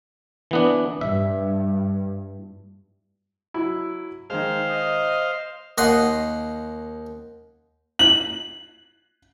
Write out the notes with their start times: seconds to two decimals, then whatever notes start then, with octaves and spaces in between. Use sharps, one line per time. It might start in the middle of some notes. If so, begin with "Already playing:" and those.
0.51 E3 B3 D4
1.01 G2 E5
3.54 F#3 E4
4.30 D#3 G#3 C5 F5
4.70 D#5
5.78 D#2 D#5 F#5 C6
7.99 F#7